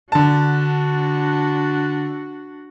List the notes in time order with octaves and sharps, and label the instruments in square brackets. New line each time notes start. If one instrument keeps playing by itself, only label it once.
[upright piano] D3 A5 [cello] D4 F#4